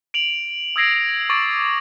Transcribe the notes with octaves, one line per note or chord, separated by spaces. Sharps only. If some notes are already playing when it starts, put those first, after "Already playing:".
D7 F7 F#7
D#6 E6 G#6 A#6 C7 D7
C#6 D6 A6 D7